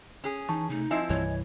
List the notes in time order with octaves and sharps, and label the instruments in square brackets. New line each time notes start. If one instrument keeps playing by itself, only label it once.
[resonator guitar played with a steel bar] C#4 G#4
[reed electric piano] E3 A5 C#6 [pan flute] D#4
[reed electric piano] C3 A3 [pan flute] D#4
[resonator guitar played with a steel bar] F3 C4 E4 [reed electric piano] D#5 G#5
[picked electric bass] C2 G2 E3 [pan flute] C#5